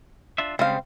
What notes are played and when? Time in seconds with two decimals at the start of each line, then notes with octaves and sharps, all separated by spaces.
0.38 D4 F4 E5
0.59 C#3 G3 G#3 C4 F5